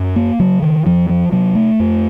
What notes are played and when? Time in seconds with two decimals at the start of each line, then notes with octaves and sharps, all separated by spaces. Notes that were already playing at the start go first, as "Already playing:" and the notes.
Already playing: F#2
0.16 A#3
0.39 C#3 F#3
0.62 D#3
0.86 F2 F3
1.09 F3
1.32 C3 F#3
1.55 A3
1.80 F2